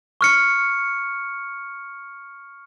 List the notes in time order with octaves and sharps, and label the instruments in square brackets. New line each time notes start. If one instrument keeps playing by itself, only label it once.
[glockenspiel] C#6 F6 C#7